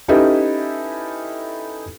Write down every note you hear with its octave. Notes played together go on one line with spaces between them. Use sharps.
C#4 D#4 E4 G4 A4 B4